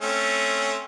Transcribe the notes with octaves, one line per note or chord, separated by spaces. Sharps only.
A3 C4 C#4